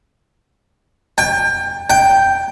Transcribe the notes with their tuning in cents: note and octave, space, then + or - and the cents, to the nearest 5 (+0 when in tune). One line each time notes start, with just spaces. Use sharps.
G5 +30
G5 +0